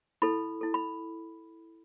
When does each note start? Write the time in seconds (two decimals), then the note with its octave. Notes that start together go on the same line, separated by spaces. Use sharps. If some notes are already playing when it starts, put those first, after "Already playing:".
0.22 E4 A4 B5
0.61 E4 A4
0.74 B5